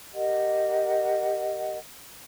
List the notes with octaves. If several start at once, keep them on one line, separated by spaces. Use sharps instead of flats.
G4 A#4 D#5 F#5